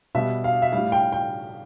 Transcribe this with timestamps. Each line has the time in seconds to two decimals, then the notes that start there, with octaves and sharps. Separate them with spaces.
0.15 B2 G3 E5
0.44 F5
0.62 E5
0.73 A2 G3 F5
0.92 G5
1.12 G5